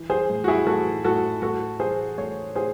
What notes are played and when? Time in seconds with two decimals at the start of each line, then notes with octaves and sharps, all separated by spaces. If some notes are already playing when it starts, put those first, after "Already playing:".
Already playing: E3
0.10 G#4 C5
0.30 A2
0.44 F#4
0.48 E4 G#4
0.66 A2 F#4 A4
1.04 A2 F#4 A4
1.42 A2 F#4 A4
1.80 E3 G#4 C5
2.18 A2 A4 C#5
2.55 A2 G#4 C5